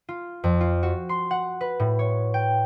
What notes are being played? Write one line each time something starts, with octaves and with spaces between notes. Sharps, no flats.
F4
F2
F4
F#4
C6
F#5
B4
A2
C#5
G5